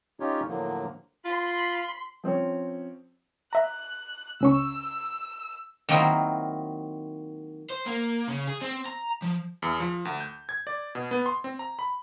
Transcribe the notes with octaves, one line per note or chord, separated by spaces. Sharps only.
C#4 D#4 F4 G4 C#5
A2 D3 F3 F#3 A#3
F4 B5 C6
F3 C4 C#4 C#5
E5 A#5 F#6
C#2 C#4 C#6 E6
D#3 F#3 A#3 C4 D#4 E4
C5
A#3
C#3
G#4
C4
A#5
F3
E2
F3
D2
G6
G#6
D5
B2
B3
C6
C4
A#5
B5